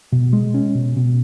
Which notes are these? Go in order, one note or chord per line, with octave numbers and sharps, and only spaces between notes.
B2
G#3
C#4
B2
B2